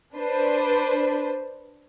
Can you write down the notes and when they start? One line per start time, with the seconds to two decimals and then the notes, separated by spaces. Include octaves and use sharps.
0.16 D4 B4 C5